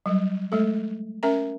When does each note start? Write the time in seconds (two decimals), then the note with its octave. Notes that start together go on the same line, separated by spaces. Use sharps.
0.06 F#3 G3
0.52 G#3 A3 A4
1.23 C#4 A#4 E5 A#5